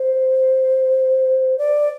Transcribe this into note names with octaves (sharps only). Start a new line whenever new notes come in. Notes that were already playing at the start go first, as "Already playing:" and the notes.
Already playing: C5
D5